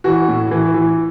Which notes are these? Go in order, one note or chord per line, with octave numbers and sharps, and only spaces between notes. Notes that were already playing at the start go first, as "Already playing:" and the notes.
E3 F#4
A2
E3
E3